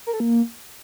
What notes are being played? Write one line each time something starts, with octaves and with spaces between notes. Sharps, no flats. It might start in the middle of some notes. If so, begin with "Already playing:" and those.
A#4
A4
A#3